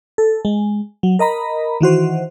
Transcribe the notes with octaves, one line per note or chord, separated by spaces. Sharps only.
A4
G#3
F#3
A#4 D#5 A#5 B5
D#3 E3 F#4 C5